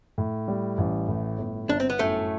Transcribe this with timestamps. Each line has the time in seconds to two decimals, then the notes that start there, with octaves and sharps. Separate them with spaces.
0.18 A2
0.48 G3
0.78 A1
1.08 A2
1.39 G1
1.69 G1 D4
1.80 C4
1.90 B3
1.99 F#2 A2 A3